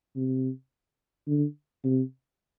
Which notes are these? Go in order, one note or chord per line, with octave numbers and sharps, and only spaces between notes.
C3
D3
C3